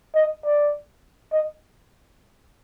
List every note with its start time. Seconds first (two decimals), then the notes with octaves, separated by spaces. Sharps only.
0.15 D#5
0.45 D5
1.32 D#5